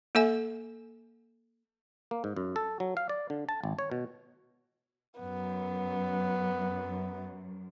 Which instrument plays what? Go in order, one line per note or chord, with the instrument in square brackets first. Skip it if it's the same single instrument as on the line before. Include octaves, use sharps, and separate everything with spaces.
[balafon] A#3 A4 E5 G#5
[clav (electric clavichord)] A#3
G#2
F#2
A4
F#3
F5
D5
D3
A5
G#1
C#5
B2
[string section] F#2 [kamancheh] B3